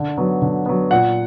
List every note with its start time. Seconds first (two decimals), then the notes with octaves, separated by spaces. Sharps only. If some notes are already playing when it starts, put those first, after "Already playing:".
Already playing: D3
0.17 F#3 B3
0.42 D3
0.66 F#3 B3
0.91 A#2 F#5